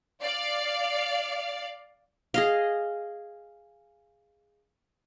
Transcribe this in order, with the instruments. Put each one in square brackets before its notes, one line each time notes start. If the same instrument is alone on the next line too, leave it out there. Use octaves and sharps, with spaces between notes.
[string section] D5 F5
[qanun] G#4 D#5 F5